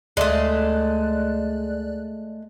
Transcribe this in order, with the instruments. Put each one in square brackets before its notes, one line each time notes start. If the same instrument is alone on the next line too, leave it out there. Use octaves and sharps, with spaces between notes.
[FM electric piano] D2 D5 F#6 [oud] G#3 A3